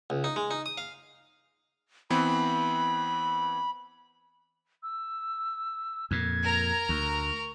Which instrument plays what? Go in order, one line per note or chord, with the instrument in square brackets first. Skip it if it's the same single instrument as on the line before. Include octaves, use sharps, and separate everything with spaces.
[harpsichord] C#2
D#4
G#3
D#4
D#6
F5
[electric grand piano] E3 B3 C4 [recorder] B5
[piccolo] E6
[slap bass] F2 A#2 [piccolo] G#6
[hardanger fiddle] A#4 A#5
[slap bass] D2 [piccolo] C#6